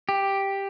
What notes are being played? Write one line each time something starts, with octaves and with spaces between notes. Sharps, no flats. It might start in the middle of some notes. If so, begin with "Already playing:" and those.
G4